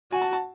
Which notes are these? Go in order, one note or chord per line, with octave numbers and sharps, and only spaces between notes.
F#4 G#5
A5
A5